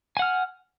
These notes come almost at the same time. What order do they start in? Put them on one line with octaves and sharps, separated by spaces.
G#5 F#5 F6